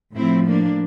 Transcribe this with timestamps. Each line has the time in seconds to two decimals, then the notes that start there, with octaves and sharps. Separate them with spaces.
0.16 A2 F3 C4 E4
0.47 A#3 D4